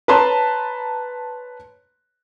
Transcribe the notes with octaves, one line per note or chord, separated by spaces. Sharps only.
B4 C#5 A5 A#5 C6